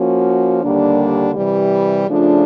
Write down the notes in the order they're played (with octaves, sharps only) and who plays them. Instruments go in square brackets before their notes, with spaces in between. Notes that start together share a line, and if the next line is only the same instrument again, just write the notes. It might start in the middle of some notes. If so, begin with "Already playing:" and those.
Already playing: [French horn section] F3 A#3 C#4 F#4
D#2 D3 G3 A#3 D4
C3 E3 G3
C#3 F3 A3 D4 F4